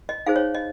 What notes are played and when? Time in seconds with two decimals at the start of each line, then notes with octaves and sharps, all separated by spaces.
0.09 D#5
0.26 D#4 G#4 C5 F5
0.36 C#5
0.54 D#5